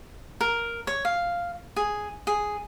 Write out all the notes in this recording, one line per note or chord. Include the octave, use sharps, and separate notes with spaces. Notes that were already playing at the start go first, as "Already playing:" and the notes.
A#4
C#5
F5
G#4
G#4